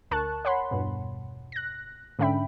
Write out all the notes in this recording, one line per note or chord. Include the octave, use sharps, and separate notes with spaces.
D2 A#4 A5 C#6 F#6
C#5 F#5 B5 C6
E2 G2 B2
F#6 A#6
G#2 D3 C#4 E5 G5 B5